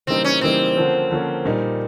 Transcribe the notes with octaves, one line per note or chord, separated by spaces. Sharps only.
C#3 E3 G3 A#3 C4 D#4
C#4
C#3 E3 G3 A#3 C4 D#4
D3 F3 A#3 C#4
D3 F3 A#3 C#4
A#2 G3 A#3 D#4